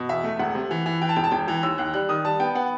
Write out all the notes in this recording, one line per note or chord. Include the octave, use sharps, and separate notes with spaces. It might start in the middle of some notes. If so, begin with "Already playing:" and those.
Already playing: B2
E2 E5
A3
E1 F#5
C3
E3
E3
E3 G5
A5
E1 G5
A5
E1 G5
E3
D#2 E6
D#2 F#6
G3 F#6
D#3 D#6
G3 A5
B3 G5
B3 F#5